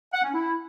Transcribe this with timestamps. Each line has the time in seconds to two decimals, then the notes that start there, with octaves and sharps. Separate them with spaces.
0.13 F#5
0.24 C#4
0.34 E4